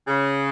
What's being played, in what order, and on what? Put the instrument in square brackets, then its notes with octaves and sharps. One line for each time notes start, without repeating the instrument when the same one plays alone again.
[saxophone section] C#3